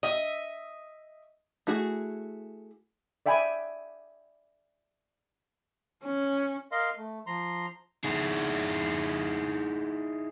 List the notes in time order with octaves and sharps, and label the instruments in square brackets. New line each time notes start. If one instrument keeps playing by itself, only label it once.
[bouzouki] D#5 E5
[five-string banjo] A3 E4 F#4 G#4
[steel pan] D5 E5 G5 G#5 B5
[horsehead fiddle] C#4
[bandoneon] A#4 D#5 F5 C6
A3
F3 A#5 C6
[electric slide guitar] D#4 E4 G#4